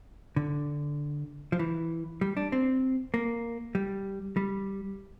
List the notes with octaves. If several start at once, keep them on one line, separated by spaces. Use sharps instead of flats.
D3
F3
E3
G3
D4
C4
A#3
G3
G3